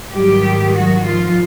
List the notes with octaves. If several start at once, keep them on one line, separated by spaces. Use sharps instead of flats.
G#2 D#3 F#3 G3 G4
F#3 F#4
F3 F4